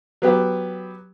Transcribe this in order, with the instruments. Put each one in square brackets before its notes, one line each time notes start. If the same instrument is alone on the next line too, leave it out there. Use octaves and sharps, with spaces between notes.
[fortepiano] F#3 B3 G4